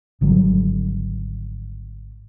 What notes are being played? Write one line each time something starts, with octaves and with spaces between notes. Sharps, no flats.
G#1 D3 F#3 G3